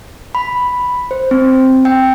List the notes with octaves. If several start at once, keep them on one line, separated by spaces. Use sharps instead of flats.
B5
C5
C4
G5